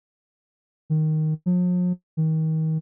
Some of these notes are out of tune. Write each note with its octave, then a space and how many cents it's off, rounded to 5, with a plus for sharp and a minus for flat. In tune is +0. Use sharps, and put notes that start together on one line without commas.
D#3 +0
F3 +45
D#3 +30